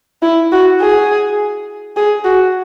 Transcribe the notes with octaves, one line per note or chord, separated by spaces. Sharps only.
E4
F#4
G#4
G#4
F#4